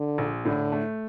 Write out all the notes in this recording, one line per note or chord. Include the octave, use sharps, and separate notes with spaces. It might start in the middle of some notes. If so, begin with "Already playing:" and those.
Already playing: D3
A#1
A2 D3
A3